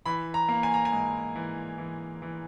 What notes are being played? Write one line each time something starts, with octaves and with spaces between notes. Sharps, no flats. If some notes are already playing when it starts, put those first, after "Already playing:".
E3 B5
A#5
A#3
G#5
A#5
G#5
G#2
E3
E3
E3